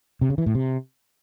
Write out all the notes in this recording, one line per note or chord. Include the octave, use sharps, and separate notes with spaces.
C3
C#3
E3
A2
C3